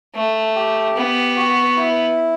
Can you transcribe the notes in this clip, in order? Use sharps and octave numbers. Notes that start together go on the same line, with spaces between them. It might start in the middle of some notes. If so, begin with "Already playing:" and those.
A3
G4
B3
F#4
E4